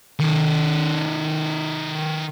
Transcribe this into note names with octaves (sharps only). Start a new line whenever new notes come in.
D#3 A4